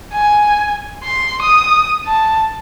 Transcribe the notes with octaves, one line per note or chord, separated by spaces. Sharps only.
G#5
C6
D#6
A5